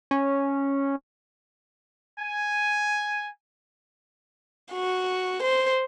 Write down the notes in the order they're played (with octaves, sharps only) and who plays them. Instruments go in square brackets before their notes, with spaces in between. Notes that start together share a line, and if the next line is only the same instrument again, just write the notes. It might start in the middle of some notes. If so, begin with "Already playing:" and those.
[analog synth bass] C#4
[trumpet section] G#5
[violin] F#4
C5